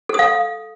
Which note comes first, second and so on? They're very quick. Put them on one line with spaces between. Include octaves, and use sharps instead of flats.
A4 D#6 F5